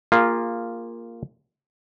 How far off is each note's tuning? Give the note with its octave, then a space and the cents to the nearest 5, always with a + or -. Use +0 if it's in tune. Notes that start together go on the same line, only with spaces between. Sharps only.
A#3 -10 F4 +0 G#4 -40